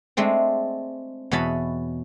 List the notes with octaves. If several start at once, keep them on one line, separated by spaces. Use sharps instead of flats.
G#3 A3 C4 D4
E2 B2 C#5 D#5 A5 B5